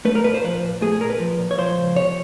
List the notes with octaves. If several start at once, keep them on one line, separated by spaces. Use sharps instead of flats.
A3 B4
A#4
A#2 B4
C5
F3 B4
A#2
A3 G#4
G#4
A#2 A#4
B4
F3
A#2
C#5
F3 C5
C#2
C3 C#5